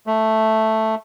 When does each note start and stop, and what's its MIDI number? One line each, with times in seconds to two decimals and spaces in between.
0.07 0.95 57